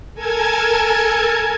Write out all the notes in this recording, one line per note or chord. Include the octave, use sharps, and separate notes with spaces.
A4 A#4 G#5 A5 G#6